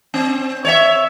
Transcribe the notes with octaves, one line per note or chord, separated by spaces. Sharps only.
C4
C#5 D5 E5